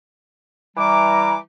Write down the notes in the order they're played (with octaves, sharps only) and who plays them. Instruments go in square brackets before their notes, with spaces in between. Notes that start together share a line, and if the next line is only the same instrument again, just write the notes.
[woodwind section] E3 G3 D6 [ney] A#5